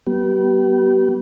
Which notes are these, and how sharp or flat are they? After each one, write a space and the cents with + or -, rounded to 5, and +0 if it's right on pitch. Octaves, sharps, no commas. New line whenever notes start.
G3 -45 B3 -25 G4 -35